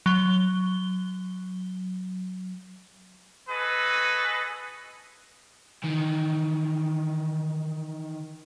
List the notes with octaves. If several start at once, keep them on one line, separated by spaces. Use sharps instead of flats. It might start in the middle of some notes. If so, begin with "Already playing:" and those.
F#3 G7
F#4 G#4 A4 B4 D#5
D#3 E3